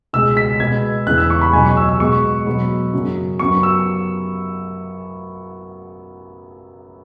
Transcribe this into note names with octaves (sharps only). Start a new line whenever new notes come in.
C#2 B2 G#3 E6
B6
B2 G#3 B3 G#6
E2 C#3 E3 B3 F#6
E6
C#6
B5
C#2 B2 F#3 G#5
C#6
E6
E6
B2 G#3 B3 C#6
B2 F#3 B3
F#2 C#3 F#3
F#2 F#3 B3 C#6
E6